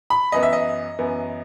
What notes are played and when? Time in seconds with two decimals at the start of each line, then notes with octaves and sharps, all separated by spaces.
0.10 B5
0.32 F#2 E3 B3 D#5
0.43 E5
0.53 D#5
0.99 F#2 E3 B3